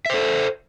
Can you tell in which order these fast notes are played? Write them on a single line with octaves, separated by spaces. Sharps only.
E5 C5 A4